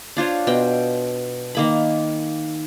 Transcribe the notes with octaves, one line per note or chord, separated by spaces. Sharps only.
D4 F4 C5 C#5
B2 G5
D#3 A#3 B5